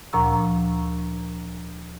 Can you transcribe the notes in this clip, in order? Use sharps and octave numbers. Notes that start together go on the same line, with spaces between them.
D2 A#2 F3 A#5 C#6 E6